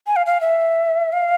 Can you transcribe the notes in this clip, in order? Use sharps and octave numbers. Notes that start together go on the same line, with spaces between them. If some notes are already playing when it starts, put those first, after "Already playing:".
G#5
F5
F5
E5
F5